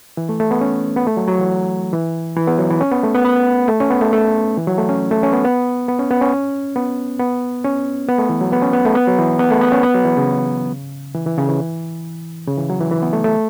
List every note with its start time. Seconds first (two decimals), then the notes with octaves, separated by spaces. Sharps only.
0.17 E3
0.29 A3
0.40 A3
0.51 B3
0.61 C#4
0.96 B3
1.07 A3
1.17 F#3
1.28 F#3
1.39 E3
1.93 E3
2.36 E3
2.47 B3
2.58 F#3
2.71 E3
2.81 C#4
2.91 B3
3.03 A3
3.14 B3
3.24 B3
3.68 A3
3.80 C#4
3.90 B3
4.01 A3
4.13 A3
4.57 E3
4.67 F#3
4.78 A3
4.89 C#4
5.11 A3
5.23 C#4
5.33 B3
5.44 B3
5.88 B3
5.99 C#4
6.11 B3
6.21 C#4
6.76 B3
7.20 B3
7.64 C#4
8.08 B3
8.18 A3
8.29 E3
8.41 F#3
8.52 B3
8.62 C#4
8.73 B3
8.85 A3
8.95 B3
9.07 F#3
9.18 E3
9.39 B3
9.51 A3
9.61 B3
9.72 C#4
9.83 B3
9.94 F#3
10.05 E3
10.17 C#3
11.15 E3
11.26 E3
11.38 C#3
11.48 E3
12.48 C#3
12.57 E3
12.70 F#3
12.81 E3
12.91 E3
13.02 B3
13.13 A3
13.24 A3